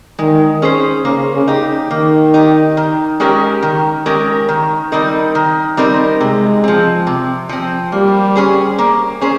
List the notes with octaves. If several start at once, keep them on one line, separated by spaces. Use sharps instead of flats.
D#3 G#3
C#4 G#4 C5
C#3 A#3
C#3
D#4 G4
D#3 A#3
D#4 G4
D#3
G#3 C#4 G4 A#4
D#3
G#3 C#4 G4 A#4
D#3
G3 C4 D#4 A#4
D#3
G3 C4 D#4 A#4
C3 G#3
F3 C4
C3
F3 C4
G3 A#3
C#4 G#4 C5
A#3
C#4 G#4 C5